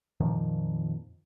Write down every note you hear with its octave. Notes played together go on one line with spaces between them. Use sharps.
F2 A#2 D#3 F3